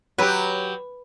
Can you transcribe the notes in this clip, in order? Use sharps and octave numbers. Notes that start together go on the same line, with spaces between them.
F#3 G4 B4